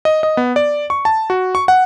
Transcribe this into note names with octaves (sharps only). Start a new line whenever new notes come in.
D#5
D#5
B3
D5
C#6
A5
F#4
C#6
F#5